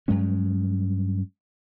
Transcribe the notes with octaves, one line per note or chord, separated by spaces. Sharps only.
G2 F#3 G#3 C#4